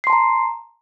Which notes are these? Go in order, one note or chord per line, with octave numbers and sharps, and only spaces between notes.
A5 A#5 C6 C7